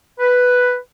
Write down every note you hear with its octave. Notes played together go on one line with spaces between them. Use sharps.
B4